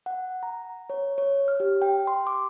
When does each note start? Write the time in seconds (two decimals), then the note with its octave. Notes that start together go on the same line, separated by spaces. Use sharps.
0.06 F#5
0.43 A#5
0.90 C#5
1.18 C#5
1.48 F6
1.60 G4
1.82 G5
2.07 C6
2.27 D6